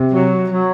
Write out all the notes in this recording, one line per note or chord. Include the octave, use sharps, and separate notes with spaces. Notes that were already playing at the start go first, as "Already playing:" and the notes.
Already playing: C3
F#3
F#3